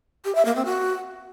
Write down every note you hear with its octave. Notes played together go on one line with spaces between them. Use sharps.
G4
E5
A#3
C4
F#4